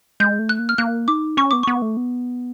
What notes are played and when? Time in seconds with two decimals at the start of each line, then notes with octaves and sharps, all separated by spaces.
0.20 G#3 G6
0.39 A3
0.49 F#6
0.59 A#3
0.69 F6
0.78 A#3 F#6
1.08 D#4 D6
1.37 C#4 C#6
1.51 B3 D6
1.63 B3 C#6
1.82 A3
1.97 B3